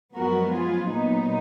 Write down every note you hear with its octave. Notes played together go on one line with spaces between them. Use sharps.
F#2 F3 G#3 B3 F#4 A#4
F4 G#4
A#2 F#3 B3 D#4